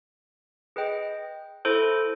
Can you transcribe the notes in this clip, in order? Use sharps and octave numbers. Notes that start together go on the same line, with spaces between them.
G#4 B4 D#5 G5
E4 A4 C5